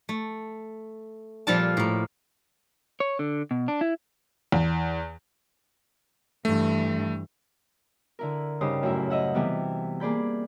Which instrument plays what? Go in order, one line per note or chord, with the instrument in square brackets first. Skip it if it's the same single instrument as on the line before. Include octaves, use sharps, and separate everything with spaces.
[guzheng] A3
A#2 F3 G3 F4 A4 A5
A2 A#3
[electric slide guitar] C#5
D3
B2
D4
E4
[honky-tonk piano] E2
[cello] G2 E3 [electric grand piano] A3
[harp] D3 E4 A#4
G2 C#3 D#4 G4 C5 D#6
F#2 A2 E4 E5
D#5 E5 F#5
C3 E3 G3 B3
A#3 G#4 D5 B5 G6